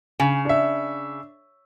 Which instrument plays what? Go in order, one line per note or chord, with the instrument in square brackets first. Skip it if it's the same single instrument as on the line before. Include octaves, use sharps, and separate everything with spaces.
[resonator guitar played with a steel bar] C#3 [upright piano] G#5
[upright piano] D4 E5